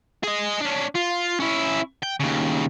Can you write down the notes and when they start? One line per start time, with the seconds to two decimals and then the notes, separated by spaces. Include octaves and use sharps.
0.24 G#4 D#5
0.61 C#4 D4
0.95 F4
1.40 C#4 E4
2.03 G5
2.20 D#2 C#3